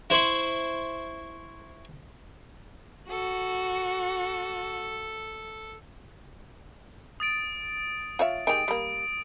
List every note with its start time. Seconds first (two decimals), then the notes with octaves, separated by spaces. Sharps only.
0.10 E4 C5 B5 C#6
3.10 F#4 A4
7.20 D#6 A6 D7
8.19 F4 C#5 E5
8.47 D#3 G#3 G4 D#6 D7
8.68 G3 A#3